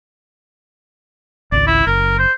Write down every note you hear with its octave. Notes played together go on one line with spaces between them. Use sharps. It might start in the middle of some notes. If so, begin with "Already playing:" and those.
G#1 C#2 D5
E4
F#1 A#4
C5